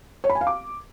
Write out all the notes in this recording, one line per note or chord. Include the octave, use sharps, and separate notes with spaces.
C#5
B5
G#5
F5
D6